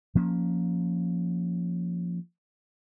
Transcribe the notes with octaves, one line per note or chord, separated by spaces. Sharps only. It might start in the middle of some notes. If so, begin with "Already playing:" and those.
F3 A#3 C#4